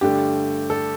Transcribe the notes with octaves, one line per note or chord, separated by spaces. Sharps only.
G2 D3 A3 G4
A4